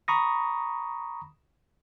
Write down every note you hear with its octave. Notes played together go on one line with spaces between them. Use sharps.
A#5 B5 C#6 D#6 A#6